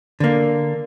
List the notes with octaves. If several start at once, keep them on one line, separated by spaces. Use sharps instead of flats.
D3 A#3